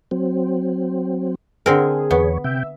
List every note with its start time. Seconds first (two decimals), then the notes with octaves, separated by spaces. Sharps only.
0.11 F#3 C4
1.66 D3 C4 G#4 A#4
2.11 E2 B3 C#5
2.44 C3 E5 G5